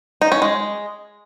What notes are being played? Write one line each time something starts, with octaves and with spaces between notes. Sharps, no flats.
D#4
C#4
G#3